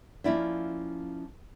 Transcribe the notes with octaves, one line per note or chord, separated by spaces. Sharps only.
F3 A#3 C#4 E4 D5 E5